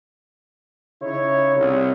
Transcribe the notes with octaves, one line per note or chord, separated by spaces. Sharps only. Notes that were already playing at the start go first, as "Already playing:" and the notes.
C#3 D#4 E4 C#5
C2